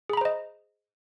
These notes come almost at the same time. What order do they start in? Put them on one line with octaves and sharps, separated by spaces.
G#4 B5 A#5 C5 D#5